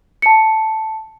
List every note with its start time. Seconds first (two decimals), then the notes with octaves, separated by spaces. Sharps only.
0.22 A5 C#7